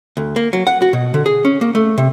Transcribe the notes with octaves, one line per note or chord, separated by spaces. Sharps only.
D2
A#3
F#3
F#5
F#4
B2
D3
G#4
C#4
A#3
A3
C3